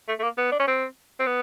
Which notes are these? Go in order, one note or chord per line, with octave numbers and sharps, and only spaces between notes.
A3
A3
A#3
B3
D4
C#4
C4
C4
B3